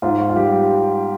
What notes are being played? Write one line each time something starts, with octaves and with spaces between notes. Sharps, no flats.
G#2 F4
F4
G3 G4